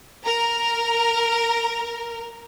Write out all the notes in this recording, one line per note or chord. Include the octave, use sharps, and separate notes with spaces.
A#4 A#5